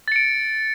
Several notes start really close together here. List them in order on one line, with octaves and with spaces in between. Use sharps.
A6 C#7 D7